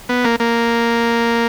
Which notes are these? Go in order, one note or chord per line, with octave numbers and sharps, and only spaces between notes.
B3
A#3
A#3